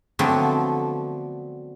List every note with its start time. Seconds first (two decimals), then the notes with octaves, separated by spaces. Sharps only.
0.19 D3 F3 F#3 A3 B3 C4